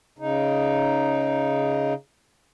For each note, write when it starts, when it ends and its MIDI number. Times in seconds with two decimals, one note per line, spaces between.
0.19 1.94 49
0.19 1.94 63